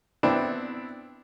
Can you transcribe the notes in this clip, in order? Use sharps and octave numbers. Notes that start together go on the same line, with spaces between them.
B3 C4 D4 E4